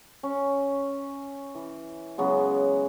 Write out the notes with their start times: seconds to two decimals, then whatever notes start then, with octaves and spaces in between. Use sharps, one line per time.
0.23 C#4
1.55 E3
2.18 C#3 F#3 G#3 B3